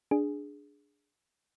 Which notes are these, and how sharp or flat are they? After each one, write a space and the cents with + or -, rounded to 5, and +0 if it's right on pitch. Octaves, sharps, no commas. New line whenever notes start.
D4 +0 G#4 +0